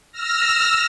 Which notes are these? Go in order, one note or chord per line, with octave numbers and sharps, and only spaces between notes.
E6 F6 A#6